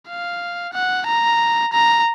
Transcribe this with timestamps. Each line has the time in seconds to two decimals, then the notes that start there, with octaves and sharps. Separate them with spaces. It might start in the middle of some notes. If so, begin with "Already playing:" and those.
0.08 F5
0.74 F#5
1.07 A#5
1.73 A#5